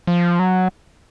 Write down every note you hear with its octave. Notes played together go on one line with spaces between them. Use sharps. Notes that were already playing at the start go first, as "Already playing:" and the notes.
F3
F#3